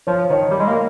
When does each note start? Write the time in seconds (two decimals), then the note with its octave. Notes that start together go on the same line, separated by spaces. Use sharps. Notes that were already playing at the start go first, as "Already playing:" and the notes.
0.07 F3 C#5
0.30 D#3 C#5
0.51 G3
0.60 G#3
0.68 A#3